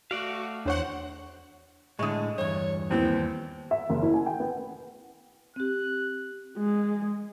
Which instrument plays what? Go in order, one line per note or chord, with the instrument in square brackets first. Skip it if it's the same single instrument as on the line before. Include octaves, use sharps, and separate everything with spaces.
[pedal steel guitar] A3 D5 F5 [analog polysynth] F#4
[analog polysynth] E2 C5 F#5 [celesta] D4 C#5 C#6
[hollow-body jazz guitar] A2 D3 [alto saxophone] G#3 [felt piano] C#6 D#6
[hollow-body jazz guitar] E2 G2 [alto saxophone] C#5
[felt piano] D#2 E3 B3 [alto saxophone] C4
[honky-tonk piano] E5
F#1
E4
G#5
G5
B3
[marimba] C4 G4 [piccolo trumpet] F#6
[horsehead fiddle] G#3